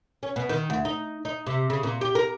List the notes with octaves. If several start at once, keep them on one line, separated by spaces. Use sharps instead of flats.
C#4
B2
D#3
D2
D#4
D#4
C3
C#3
A#2
G4
A#4